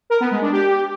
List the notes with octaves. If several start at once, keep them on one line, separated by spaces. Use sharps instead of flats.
A#4
B3
G#3
D4
G4